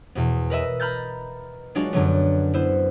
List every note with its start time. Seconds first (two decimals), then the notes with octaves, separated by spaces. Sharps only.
0.15 E2 B2 B3
0.50 A#4 B4 D#5 E5
0.80 A#5 B5 F6 G6 A6
1.75 F#3 G#3 D4 F4 F#4
1.93 F#2 D3 F#3 B3
2.54 B3 E4 C5